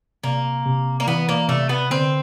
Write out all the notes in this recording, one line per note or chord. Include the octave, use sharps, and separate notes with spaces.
C3 A#3
C3
A#3
E3 B3
A#3
C3 A3
B3
D3 C4